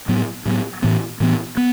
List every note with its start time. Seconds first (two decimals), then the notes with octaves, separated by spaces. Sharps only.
0.08 A2 F#3 B3
0.46 A2 F#3 B3
0.82 A2 E3 B3
1.20 A2 E3 B3
1.57 B3